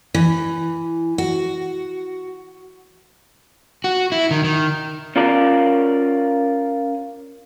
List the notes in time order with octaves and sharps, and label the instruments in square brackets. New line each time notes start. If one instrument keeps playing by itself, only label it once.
[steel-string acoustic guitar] E3
F#4
[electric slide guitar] F#4
E4
D#3
D#3
[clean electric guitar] C#4 F4 A#4 D5